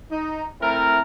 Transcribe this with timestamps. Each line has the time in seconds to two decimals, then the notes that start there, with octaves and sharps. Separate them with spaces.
0.11 D#4
0.61 A3 C4 E4 A#4